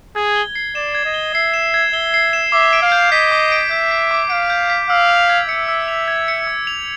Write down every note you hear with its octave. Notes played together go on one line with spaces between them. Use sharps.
G#4 G#6
G7
C7
D5 E7
G#6
D#5
G7
E5 C7
E7
G#6
E5 G7
C7
E7
E5 D6
D7
F5
G6
D#5 B6
D6
D7
E5 G6
B6
D6
F5 D7
G6
B6
F5 E6
F7
G#6
E5 C#7
E6
F7
G#6
C#7
E6
F7